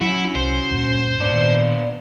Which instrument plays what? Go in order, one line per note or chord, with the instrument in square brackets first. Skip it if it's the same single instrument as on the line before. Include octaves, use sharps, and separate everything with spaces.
[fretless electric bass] F#3 [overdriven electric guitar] C#4 F#4 [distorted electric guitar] E4
[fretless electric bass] C2 [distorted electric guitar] C5
[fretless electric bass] D2 G2 A#2
[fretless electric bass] G#2 [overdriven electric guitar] B3 D4 [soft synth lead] D5
[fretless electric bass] A#2 D#3